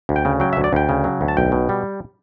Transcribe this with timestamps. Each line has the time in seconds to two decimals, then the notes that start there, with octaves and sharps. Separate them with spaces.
0.09 D2
0.16 G5
0.25 C#3
0.40 F#3 G5
0.53 E5
0.57 D2
0.64 D5
0.73 D2 G5
0.89 C#3
1.04 F#3
1.21 D2
1.28 A5
1.37 B1 G5
1.52 B2
1.69 G3